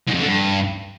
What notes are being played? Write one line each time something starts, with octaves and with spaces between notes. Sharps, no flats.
G#2
F2
D3
G2